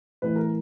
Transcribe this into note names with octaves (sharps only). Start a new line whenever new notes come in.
A2 E3 B4
A#4